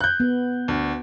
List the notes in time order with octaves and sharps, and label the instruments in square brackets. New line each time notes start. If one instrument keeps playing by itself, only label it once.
[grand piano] F#6 G6
[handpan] B3
[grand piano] D2